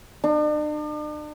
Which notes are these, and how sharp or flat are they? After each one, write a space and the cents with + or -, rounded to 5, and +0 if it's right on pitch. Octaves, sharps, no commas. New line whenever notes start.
D4 +45